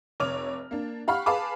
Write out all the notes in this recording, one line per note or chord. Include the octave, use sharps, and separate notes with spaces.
F1 C#5 D6 F6 F7
A#3 D4
G4 F5 F#5 B5 C#6 F6
G#4 B4 F5 A5 B5 D6